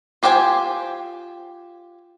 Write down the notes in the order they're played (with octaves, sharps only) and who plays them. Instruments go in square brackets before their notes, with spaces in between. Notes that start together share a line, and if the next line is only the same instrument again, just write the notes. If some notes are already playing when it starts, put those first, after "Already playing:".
[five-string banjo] F4 G4 C5 G5 G#5